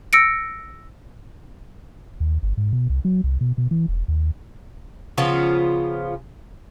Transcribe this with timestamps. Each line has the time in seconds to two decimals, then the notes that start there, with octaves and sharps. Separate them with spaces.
0.13 E6 A#6 C#7 D7
2.20 D#2
2.43 G1
2.57 G#2
2.73 B2
2.90 C2
3.05 F#3
3.24 C2
3.41 B2
3.58 B2
3.71 E3
3.88 E1
4.08 D#2
5.18 C#3 F3 B3 F4